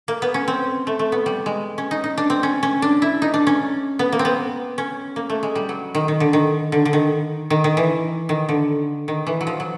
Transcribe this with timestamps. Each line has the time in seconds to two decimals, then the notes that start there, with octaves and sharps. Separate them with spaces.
0.08 A#3
0.22 B3
0.34 C#4
0.48 C4
0.87 A3
0.99 A3
1.12 B3
1.26 G3
1.46 G#3
1.78 C#4
1.91 D#4
2.04 D#4
2.18 D4
2.30 C4
2.43 C#4
2.63 C#4
2.82 D4
3.02 E4
3.22 D#4
3.34 D4
3.47 C#4
3.99 B3
4.12 A#3
4.19 C4
4.25 B3
4.78 C#4
5.16 A#3
5.30 A3
5.43 G#3
5.55 G3
5.69 F#3
5.95 D#3
6.08 D#3
6.20 D3
6.33 D#3
6.72 D3
6.85 D3
6.93 D#3
7.50 D#3
7.64 D#3
7.77 E3
8.29 D#3
8.49 D3
9.08 D#3
9.27 E3
9.41 F#3
9.47 F3
9.60 F#3